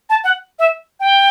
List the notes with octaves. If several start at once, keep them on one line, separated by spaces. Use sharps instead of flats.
A5
F#5
E5
G5